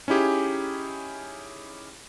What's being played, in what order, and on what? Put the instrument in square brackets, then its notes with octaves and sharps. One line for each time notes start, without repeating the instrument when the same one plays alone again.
[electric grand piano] C#4 D#4 E4 G4 G#4